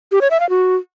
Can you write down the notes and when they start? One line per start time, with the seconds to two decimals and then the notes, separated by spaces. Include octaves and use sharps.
0.12 G4
0.21 C#5
0.31 E5
0.40 F5
0.50 F#4